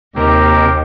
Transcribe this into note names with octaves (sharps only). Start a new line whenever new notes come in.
D#2 C3 A#3 D#4 G4 A#4